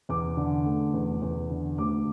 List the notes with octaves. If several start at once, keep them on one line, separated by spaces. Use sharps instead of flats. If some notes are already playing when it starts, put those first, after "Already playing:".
E2 D6
D3
A3
E2
E2
D3
D2 D6